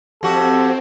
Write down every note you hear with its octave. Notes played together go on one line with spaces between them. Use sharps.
F2 C4 F#4 G4 A4